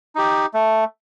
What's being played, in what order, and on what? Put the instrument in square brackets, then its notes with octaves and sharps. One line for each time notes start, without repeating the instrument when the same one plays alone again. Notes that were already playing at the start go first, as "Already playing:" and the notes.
[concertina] D#4 G4
A3